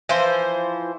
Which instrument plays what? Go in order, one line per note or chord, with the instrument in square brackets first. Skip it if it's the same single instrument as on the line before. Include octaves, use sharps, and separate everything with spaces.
[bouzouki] E3 F3 C5